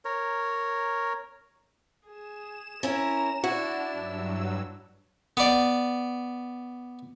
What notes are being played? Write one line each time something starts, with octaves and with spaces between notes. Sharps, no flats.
A#4 C#5
G#4 E7
C#4 E4 A#4 A#5
D4 E4 F#4
G2 F#3 E6
B3 D5